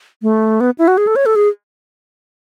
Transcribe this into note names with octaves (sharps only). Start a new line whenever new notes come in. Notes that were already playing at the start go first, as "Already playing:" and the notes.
A3
B3
E4
F#4
G#4
A4
C#5
A4
G#4